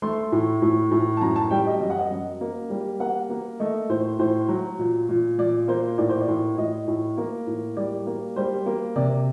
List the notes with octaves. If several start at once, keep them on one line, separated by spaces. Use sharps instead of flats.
A3 C6
A2
A2
A2
A5
F#2 A#5
A5
G3 G5
D#5
F#2 D#5
F#5
D#5
F#2
A#3
G3
A#3 F#5
A#3
A3 D#5
A2 C5
A2 C5
F#3
A#2
A#2
A#2 D5
A#3 C5
A2 D5
C5
D5
A2
A2 D#5
A2
A#3
A2
G3 D5
A#3
G3 C5
A#3
C3 D5